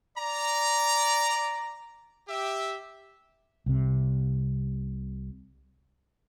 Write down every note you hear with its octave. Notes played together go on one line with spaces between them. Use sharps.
D5 A#5
G4 E5
C2 C3